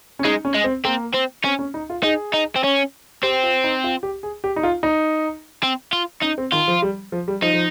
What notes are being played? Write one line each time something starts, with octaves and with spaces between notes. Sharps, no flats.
C#4
G#3 D#4
C#4
G#3
C4
A#3 C4
C4
C4 C#4
C#4
D#4
F4
D#4 G#4
D#4
C4
C#4
C4 G4
F4
D#4
F4
G4
G#4
G4
D#4
F4
D#4
C4
F4
C#4 D#4
C4
D#3 F4
F3
G3
F3
G3
F3 D#4
F3